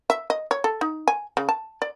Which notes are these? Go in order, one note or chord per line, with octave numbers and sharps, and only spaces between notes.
E5
D#5
C#5
A4
D#4
G#5
C#3
A5
D5